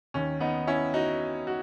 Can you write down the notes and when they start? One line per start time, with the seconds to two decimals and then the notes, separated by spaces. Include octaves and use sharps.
0.14 D#2 D#3 C#4
0.40 B3 D#4
0.67 C#4 E4
0.94 D#4 F#4
1.47 F#4